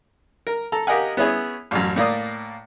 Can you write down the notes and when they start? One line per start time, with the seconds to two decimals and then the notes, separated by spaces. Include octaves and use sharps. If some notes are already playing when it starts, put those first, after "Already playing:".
0.47 A#4
0.72 A4 A#5
0.87 G4 A#4 D#5 F5 F#5 G#5
1.17 B3 C#4 E4 G#4 C#5
1.71 A1 F#2
1.96 A2 A#3 D5 D#6